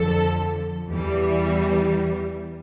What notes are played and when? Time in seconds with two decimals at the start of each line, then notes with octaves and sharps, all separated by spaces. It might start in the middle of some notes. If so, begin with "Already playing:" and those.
Already playing: F2 D3 F3 A4
0.88 E2 E3 G3